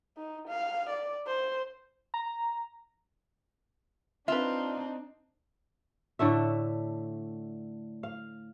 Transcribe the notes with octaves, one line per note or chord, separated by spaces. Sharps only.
D#4
F5
D5
C5
A#5
C4 D4 D#4 F4 B4 E5
A2 D3 A3 E5
F5